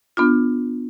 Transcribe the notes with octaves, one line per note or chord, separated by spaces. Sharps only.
B3 D4 F4